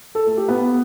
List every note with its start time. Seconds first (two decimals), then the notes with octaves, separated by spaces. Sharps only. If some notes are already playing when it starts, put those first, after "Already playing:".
0.15 A4
0.26 A3
0.37 G4
0.48 B3